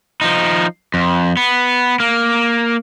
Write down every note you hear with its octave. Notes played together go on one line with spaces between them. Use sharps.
F3 D#4
F2
B3
A#3